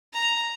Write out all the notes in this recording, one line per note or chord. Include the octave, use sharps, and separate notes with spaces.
A#5